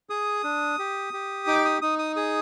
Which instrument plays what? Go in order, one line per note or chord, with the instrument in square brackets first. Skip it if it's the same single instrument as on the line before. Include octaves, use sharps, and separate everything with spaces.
[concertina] G#4 D#6
D4
G4
G4
D#4 D6
D#6
D#4 D#6
D#6
G#4 D#6